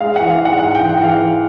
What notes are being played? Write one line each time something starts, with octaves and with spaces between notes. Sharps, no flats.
G#3 F5
F#5
E3
F5
G#2 F#5
G#2 F#5
E3 G5
F#5
E3 F5
E3